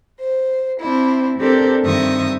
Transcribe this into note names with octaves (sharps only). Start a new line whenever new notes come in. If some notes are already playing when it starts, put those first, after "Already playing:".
C5
C4 D4 E4
C4 D4 G4 A4 A#4 C5
G2 D#3 C4 E5 C#6 D#6